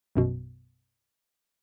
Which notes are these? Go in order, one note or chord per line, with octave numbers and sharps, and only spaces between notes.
A#1 F#2 B2